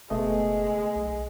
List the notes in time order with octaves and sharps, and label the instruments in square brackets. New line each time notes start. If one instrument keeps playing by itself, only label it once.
[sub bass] F#1 [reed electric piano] B2 A3 D#5 [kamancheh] G#3
[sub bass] B1